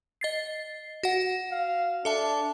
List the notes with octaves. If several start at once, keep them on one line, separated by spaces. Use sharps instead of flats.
D#5 A6 C7
F#4 F#5
F5
D4 A4 E5 A5